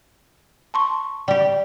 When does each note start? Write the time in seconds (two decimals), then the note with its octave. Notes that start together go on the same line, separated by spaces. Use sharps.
0.74 A5 C6 C#6
1.28 G3 G4